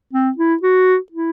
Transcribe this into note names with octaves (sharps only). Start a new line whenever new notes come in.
C4
E4
F#4
E4